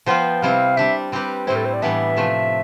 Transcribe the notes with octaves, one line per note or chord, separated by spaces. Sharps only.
F3 B3 F4 C5 G5
C3 G3 C4 E4 F5
G3 D4 G4 E5
G3 C4 G4 B4
A2 G3 C4 E4 C5
A4
C5
D5
A2 E3 G3 B3 D4 E5
C3 F3 A3